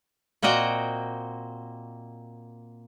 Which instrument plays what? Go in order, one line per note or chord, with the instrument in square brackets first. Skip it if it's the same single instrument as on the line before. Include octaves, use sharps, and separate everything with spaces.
[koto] A#2 A#3 C4 F#4 D#5 G5